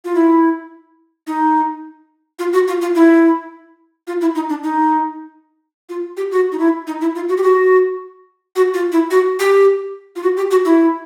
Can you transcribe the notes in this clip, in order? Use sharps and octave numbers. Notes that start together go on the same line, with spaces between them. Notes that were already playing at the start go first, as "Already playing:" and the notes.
F4
E4
D#4
F4
F#4
F4
F4
E4
F4
E4
D#4
D4
D#4
F4
G4
F#4
D#4
E4
D#4
E4
F4
F#4
G4
F#4
F#4
F4
E4
F#4
G4
F4
F#4
G4
F#4
E4